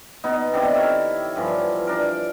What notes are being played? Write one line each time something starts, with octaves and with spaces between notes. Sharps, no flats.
B2 B3 D#4
C3 D#3 D4 E4
G4 A4 A#4 C#5
G2 E3 F3
D4 A#4